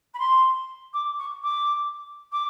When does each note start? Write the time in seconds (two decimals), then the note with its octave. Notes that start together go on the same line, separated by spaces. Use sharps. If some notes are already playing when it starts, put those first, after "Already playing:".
0.14 B5
0.19 C6
0.93 D6
1.18 C#6
1.43 D6
2.32 D6